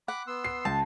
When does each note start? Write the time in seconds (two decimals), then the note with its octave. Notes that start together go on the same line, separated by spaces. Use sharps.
0.08 F#5 B5 D6
0.27 B3 C6 E6
0.44 C7
0.65 C#2 A5